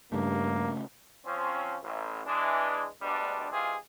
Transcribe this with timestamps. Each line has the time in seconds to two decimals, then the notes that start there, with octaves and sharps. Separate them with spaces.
0.12 G2 C#3 A3 A#3
1.25 F3 C4 C#4
1.82 A1
2.25 E3 G#3 D4
3.01 D2 B2 G3 G#3 D4
3.50 E3 G#3 C4 F4 G4 G#4